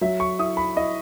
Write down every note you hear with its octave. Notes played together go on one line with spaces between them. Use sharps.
F#3 E5
C#6
E4 D#6
B5
E4 D#5